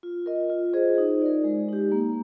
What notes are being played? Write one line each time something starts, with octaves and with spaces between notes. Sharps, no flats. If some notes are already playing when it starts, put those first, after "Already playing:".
F4
A#4 D#5
F4
G#4 C5 D#5
D#4
A#4 D5
G#3
D#4 G4
A#3